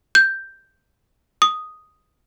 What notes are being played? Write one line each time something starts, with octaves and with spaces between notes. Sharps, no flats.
G6
D#6